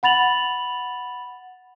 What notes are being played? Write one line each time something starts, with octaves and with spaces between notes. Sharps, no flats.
F#5 B5 A6 F7 F#7